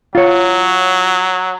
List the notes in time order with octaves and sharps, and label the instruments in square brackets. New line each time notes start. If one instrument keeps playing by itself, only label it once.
[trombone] F#3 [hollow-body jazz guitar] F4 C#5